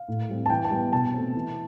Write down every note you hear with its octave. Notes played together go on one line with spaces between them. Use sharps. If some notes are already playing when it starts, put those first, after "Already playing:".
Already playing: F5
A2
G3 C4
A5
E3 G5
A5
G3 B3 G5
B2 A5
A3 C4
E3